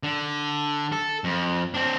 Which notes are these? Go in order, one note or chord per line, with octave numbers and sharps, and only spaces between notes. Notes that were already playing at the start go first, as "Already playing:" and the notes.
D3
A4
F2
C4 D4